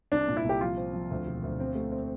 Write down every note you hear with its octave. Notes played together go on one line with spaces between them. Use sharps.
C2 D4
A#2
E4
C2
G4
F3 F4
C4
F3
D2
E1
D2
C4
A3
C4